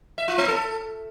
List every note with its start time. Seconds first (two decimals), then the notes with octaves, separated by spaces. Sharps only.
0.18 E5
0.28 F4
0.38 B3
0.48 A4